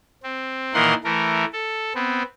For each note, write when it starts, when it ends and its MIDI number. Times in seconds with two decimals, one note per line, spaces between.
0.23 0.74 60
0.74 0.94 46
0.74 0.94 51
0.74 0.94 52
0.74 0.94 70
0.74 0.94 78
0.74 0.94 84
1.04 1.45 52
1.04 1.45 57
1.04 1.45 70
1.52 1.93 69
1.95 2.22 59
1.95 2.22 60